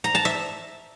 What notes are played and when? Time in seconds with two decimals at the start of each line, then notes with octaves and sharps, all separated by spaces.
0.04 A#5
0.15 A5
0.25 E5